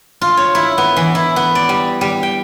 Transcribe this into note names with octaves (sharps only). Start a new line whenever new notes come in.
F4
C#5
E4
B3
E3
E4
B3
D5
G3
G3
G5